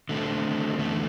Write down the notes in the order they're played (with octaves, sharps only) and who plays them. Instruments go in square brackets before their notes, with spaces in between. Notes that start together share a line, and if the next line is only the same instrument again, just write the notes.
[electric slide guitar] D3 A3 C4
E2 D3 A3